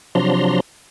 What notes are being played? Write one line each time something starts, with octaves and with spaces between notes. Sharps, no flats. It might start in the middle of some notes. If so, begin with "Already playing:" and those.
C3 F3 F#3 D4 A#5 C6